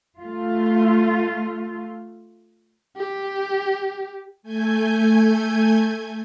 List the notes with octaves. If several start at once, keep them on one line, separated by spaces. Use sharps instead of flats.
A3 F4
G4
A3 G#5 G6 G#6